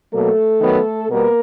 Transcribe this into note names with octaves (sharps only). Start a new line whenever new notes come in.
B2 F#3 A3 A#3 A4
D#3 F#3 B3
B2 G3 A#3 B3 A#4